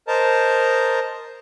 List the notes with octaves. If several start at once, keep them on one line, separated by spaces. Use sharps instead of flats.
A#4 C5 D#5 A5 A#5